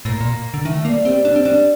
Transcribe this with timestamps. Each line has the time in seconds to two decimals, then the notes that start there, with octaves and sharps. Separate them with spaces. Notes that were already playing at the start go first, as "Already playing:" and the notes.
0.05 A2 A#3
0.21 A#2
0.54 D3
0.65 D#3 A3
0.85 G3 A#3
1.05 G3 C4
1.25 G3 D4
1.36 C4
1.45 G3 D4